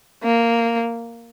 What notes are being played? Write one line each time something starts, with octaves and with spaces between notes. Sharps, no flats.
A#3